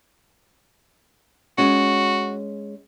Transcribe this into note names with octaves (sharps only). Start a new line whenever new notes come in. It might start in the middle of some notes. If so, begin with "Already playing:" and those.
G#3 C#4 F#4